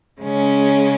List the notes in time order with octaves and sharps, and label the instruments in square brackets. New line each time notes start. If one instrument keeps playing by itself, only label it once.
[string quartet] C#3 G#3 C#4